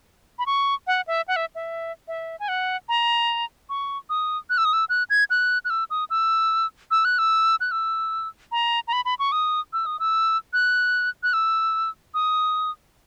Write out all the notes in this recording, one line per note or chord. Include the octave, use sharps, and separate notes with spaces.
B5
C#6
F#5
E5
F#5
E5
E5
E5
G#5
F#5
A#5
C#6
D#6
F#6
E6
D#6
E6
F#6
G#6
F#6
F#6
E6
D#6
E6
E6
F#6
E6
F#6
E6
A#5
A#5
B5
B5
C#6
D#6
E6
D#6
E6
F#6
F#6
E6
D#6